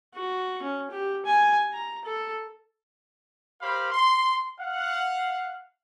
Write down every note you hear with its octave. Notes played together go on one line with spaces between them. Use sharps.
F#4
C#4
G4
G#5
A#5
A4
G4 A#4 C5 F5 B5
C6
F5 F#5